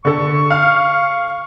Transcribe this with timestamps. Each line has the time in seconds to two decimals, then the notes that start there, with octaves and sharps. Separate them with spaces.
0.05 D3 A4 C#6
0.50 F5 F6